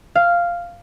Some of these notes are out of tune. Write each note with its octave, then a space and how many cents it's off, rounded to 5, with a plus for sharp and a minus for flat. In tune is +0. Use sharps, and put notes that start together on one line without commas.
F5 -5